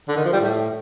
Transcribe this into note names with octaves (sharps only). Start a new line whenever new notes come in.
D3
D#3
F3
G3
A2